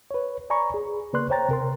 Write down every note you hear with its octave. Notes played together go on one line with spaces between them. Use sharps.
B4 C#5
D5 G#5 A#5 B5 C#6
G#4
C#3 A#3 B4 D5 C6 F#6
C5 C#5 G5 A#5 A6
C3 A#4 C6